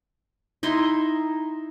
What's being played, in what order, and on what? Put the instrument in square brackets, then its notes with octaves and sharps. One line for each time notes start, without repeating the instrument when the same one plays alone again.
[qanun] D#4 E4 E5 C6